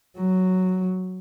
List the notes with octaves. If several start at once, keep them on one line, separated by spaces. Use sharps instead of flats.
F#3